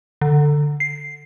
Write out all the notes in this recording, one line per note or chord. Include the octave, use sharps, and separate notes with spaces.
D3
C7